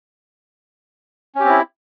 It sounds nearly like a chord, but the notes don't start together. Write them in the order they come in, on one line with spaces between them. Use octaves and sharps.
C#4 G4 C4 E4